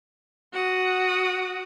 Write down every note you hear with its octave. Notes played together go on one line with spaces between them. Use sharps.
F#4 F#5 D#6